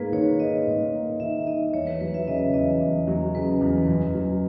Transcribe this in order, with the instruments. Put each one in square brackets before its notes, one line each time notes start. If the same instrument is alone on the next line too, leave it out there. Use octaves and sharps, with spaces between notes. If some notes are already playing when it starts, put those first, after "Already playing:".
Already playing: [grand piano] G#2 A#3 [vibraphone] G#4 B4
[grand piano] D#3 [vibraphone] C#5
[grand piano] D#4 [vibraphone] D#5
[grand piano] G#2
A#3
[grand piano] D#3 [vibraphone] E5
[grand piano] D#4 [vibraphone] D#5
[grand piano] E2 [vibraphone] C#5
[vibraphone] B4
[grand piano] F#3 [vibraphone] B4
[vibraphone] E5
[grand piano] C#3 [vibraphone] D#5
[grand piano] E2 [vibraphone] D#5
[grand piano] E2
F#3
[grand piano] C#3 [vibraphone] B4
[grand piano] E2
F#2
F#3